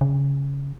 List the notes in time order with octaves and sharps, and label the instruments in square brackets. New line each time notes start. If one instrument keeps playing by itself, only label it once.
[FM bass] C#3